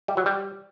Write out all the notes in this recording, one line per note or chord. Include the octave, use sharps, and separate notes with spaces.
G3
F#3
G3